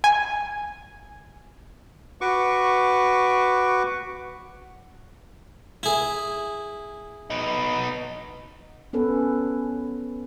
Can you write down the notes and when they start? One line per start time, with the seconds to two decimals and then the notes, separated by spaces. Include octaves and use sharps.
0.04 G#5
2.21 F#4 B4 C#6 D6
5.83 E4 G#4
7.30 B3 D#4
8.93 B3 C#4 A4 B4